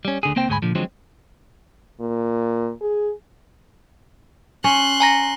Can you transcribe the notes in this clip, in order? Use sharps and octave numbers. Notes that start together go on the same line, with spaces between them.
G3 C#4
D2 D3 G#4
C#2 A#3 C4 C5 G5
D2 G#2 G#3 B3 G#5 B5
A#2 D3 F3
D3 F3 F#3 G#3 C4
A#2
G#4
C#4 C6 F#6
G#5 A#5 A#6